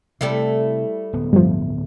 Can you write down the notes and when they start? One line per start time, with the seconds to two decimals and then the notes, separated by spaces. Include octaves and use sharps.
0.21 C3 G3 A3 E4
1.13 D1 B3
1.33 G2 F3